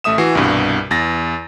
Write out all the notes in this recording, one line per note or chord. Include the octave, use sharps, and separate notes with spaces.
A1 A3 E5 D#6 E7
E3 F#4 C7
C2 G2 B2
E2 A6 A#6